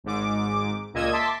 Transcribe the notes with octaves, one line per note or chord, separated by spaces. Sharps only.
G#1 G#2 D6
C#2 A#2 D#5 E6 G#6
E5 A5 C6 D6 B6